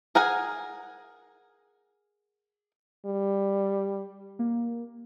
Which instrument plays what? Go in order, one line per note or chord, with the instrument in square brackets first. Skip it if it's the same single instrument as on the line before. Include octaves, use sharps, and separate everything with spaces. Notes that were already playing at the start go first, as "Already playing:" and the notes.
[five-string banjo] G#4 A#4 F#5 G#5
[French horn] G3
[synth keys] A#3